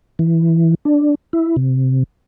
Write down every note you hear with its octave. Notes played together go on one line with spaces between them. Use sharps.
E3
D4
E4
C3